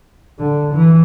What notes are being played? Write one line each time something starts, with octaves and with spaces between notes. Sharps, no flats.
D3
E3